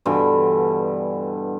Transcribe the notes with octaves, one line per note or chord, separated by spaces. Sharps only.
G2 B2 D3 E3